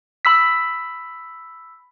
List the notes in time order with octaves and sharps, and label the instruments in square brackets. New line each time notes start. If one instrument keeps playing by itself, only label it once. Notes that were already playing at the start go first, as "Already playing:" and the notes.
[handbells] B5 E6 B6